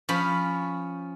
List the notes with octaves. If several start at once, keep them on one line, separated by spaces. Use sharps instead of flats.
F3 C#4 B5